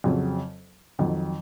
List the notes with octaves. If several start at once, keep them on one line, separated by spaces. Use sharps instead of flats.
F2 C#3 F#3 C4
F2 D#3 F#3